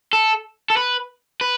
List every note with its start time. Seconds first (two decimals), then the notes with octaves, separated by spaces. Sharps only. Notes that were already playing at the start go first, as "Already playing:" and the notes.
0.13 A4
0.70 A4
0.77 B4
1.41 B4